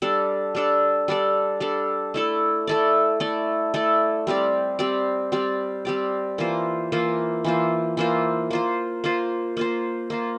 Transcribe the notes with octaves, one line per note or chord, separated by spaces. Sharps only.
G3 D4 A4 D5
G3 D4 A4 D5
G3 D4 A4 D5
G3 D4 A4 D5
A3 E4 A4 D5
A3 E4 A4 D5
A3 E4 A4 D5
A3 E4 A4 D5
G3 C4 G4 D5
G3 C4 G4 D5
G3 C4 G4 D5
G3 C4 G4 D5
E3 A#3 F4 C5
E3 A#3 F4 C5
E3 A#3 F4 C5
E3 A#3 F4 C5
A#3 F4 C5
A#3 F4 C5
A#3 F4 C5
A#3 F4 C5